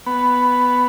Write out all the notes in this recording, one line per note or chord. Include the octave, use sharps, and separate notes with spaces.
B3